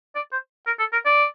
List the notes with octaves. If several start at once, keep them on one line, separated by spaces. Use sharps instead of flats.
D5
C5
A#4
A4
A#4
D5